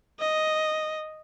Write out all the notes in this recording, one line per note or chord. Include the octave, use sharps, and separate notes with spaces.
D#5